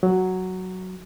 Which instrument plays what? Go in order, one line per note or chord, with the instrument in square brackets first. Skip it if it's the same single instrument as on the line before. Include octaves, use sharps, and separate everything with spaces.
[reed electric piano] F#3